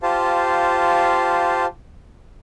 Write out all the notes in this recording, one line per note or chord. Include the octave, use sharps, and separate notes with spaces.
F4 G4 C5 F5 A5